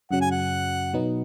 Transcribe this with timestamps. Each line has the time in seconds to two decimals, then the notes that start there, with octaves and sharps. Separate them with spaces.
0.11 F#2 C#3 F#3 F#5
0.21 G#5
0.31 F#5
0.93 B2 F#3 B3 D#4